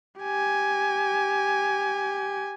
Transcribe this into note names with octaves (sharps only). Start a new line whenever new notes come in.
G4 G#5